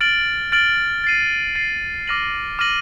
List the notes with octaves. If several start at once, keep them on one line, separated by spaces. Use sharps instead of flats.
F6 A6 D7 F#7
F6 A6 D7 F#7
A6 C7 D#7
A6 C7 D#7
D6 F6 A#6 D#7 F#7
D6 F6 A#6 D#7 F#7